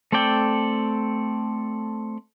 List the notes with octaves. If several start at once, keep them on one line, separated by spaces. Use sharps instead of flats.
A3 C4 A4 D5 G5